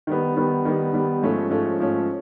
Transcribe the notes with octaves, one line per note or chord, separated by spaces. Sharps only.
D#3 G3 B3
D#3 G3 B3
D#3 G3 B3
D#3 G3 B3
G#2 F3 A3 C#4
G#2 F3 A3 C#4
G#2 F3 A3 C#4